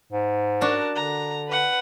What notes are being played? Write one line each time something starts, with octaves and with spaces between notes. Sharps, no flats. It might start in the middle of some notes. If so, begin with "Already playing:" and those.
G#2
D4 F#4 A#4 A5
D3 A#5
B4 F#5